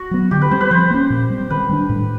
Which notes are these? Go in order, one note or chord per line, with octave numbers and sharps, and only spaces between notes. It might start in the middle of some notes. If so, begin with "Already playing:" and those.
Already playing: F#4
F#3 B3
D3 G4
B4
G3 C4 C5
B4
F3 C5
A#3 C#4
A#2
G3 C4
D#3 B4
G3 B3 D4
A2